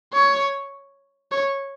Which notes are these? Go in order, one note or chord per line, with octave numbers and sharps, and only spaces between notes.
C#5
C#5